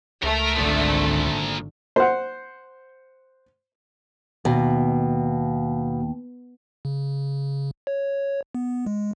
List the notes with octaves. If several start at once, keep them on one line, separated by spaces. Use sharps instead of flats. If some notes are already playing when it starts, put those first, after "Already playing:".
C#2 A3 A#4
G#1 A#2 D3 F3
C5 F#5
D#2 B2
C#3
C#5
B3
G#3